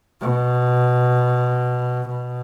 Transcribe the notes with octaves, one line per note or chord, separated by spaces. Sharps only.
B2
B2